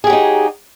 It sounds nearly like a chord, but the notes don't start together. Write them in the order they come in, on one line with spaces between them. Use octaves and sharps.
G#4 G4 F#3 D#4